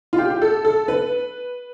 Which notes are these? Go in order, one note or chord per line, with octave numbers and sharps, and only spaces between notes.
F4
G4
G4
A4
A4
B4